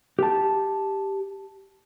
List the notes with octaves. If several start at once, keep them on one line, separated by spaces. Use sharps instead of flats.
G4 A5